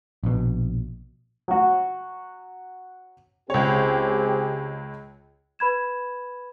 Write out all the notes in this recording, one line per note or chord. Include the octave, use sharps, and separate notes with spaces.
A#1 B2
F#3 F#4
C#2 C4 G4 G#4 C#5
B4 B5 G#6 E7